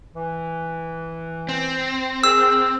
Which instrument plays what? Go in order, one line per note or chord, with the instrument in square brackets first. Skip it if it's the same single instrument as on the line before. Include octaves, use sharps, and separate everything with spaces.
[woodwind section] E3
[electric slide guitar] C4
[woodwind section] G#4 A#4 [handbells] E6